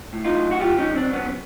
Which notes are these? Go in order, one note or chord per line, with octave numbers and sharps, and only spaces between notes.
A2
D#4 F4
F#3
F#4
F#3 F4 G4
C#4 D#4
F#3
C4 D4
F#3
B3 C#4